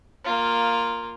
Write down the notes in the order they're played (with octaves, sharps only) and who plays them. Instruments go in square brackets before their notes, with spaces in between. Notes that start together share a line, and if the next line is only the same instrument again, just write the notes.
[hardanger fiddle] A#3 F4